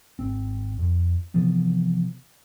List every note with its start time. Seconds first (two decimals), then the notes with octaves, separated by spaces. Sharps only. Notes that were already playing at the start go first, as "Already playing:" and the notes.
0.19 G#1 C4
0.79 F2
1.34 C3 E3 F3 B3